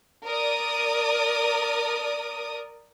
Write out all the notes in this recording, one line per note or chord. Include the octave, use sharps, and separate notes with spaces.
A#4 D5 D#6